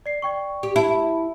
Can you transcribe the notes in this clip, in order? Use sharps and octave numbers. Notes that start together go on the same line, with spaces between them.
D5 C7
D5 G5 C#6
G4
E4 A5